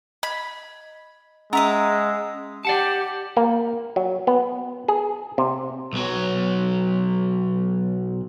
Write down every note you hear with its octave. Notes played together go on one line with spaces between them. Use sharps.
D#5 B5
G#3 C#4 D#5 E5 A#5 E6
G4 D5 F#5 A5
A#3
F#3
B3
G#4
C3
B1 F#3